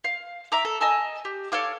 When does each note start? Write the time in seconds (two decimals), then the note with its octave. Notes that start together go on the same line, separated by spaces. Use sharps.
0.04 F5
0.52 E5 A#5 D6
0.65 A4
0.81 D#5 G#5 A5 E6
1.25 G4
1.52 A4 C#5 F5 D6